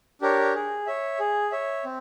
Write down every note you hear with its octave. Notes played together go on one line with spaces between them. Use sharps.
D4 G4 A#4 C#5
G#4
C#5 E5
G#4
C#5 E5
C4